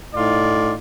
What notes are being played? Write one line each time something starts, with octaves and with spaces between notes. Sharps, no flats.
A2 D#4 F4 D5